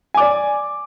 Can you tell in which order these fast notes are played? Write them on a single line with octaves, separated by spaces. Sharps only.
G#5 D6 D5